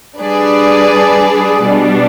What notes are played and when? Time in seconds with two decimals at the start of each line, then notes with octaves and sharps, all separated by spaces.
0.19 G3 D4 G#4 B4 D5
1.62 B2 G3 D4